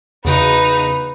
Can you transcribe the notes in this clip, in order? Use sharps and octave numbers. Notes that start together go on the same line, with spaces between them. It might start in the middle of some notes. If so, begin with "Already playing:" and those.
E2 C#3 D#4 F#4 B4